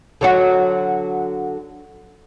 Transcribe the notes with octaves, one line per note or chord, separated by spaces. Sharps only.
D3 F#3 F#4